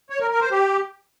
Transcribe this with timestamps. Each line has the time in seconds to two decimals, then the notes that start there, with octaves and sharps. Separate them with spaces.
0.10 C#5
0.20 A#4
0.31 A#4
0.41 C5
0.51 G4